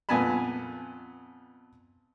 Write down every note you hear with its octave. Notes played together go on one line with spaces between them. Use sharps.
F2 A#2 B3 G#5 A5 B5